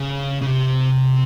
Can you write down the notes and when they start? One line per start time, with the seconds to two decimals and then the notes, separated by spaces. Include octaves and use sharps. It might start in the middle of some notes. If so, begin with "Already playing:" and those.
Already playing: C#3
0.42 C#3
0.47 C3